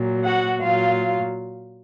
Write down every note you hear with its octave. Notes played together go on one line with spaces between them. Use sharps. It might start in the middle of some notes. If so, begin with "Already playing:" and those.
Already playing: A#2 F#3
F#4 F#5
A#2 F#3 F4 F5